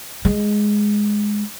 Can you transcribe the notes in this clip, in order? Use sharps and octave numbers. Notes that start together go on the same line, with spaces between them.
G#3